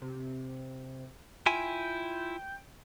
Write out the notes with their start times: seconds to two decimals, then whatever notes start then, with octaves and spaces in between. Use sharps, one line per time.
0.02 C3
1.46 E4 F4 G5 G#5